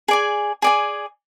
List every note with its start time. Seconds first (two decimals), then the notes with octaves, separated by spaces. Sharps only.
0.08 G#4 D5 G#5
0.62 G#4 D5 G#5